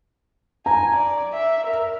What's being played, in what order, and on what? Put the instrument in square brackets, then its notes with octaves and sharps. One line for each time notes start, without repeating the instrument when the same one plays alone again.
[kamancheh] G#5 [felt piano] A#5
[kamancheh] D5
E5
A#4